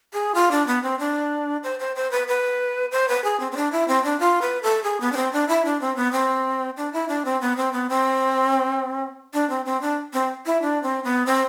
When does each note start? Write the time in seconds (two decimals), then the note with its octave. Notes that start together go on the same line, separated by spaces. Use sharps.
0.13 G#4
0.35 F4
0.51 D4
0.67 B3
0.83 C4
0.99 D4
1.64 C5
1.80 C5
1.96 C5
2.11 B4
2.28 B4
2.92 C5
3.08 B4
3.24 G#4
3.40 C4
3.52 C4
3.56 D4
3.72 E4
3.88 C4
4.04 D4
4.20 F4
4.42 B4
4.63 A4
4.84 G#4
5.01 B3
5.12 D4
5.16 C4
5.33 D4
5.48 E4
5.65 D4
5.81 C4
5.96 B3
6.12 C4
6.77 D4
6.93 E4
7.09 D4
7.25 C4
7.41 B3
7.57 C4
7.73 B3
7.89 C4
9.33 D4
9.50 C4
9.65 C4
9.81 D4
10.13 C4
10.46 E4
10.62 D4
10.83 C4
11.04 B3
11.26 C4